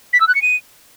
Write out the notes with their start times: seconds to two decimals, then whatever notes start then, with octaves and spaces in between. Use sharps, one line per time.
0.13 B6
0.20 E6
0.28 F#6
0.35 C#7
0.42 D#7